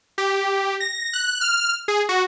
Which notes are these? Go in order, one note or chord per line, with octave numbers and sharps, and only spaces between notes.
G4
A#6
F#6
F6
G#4
F#4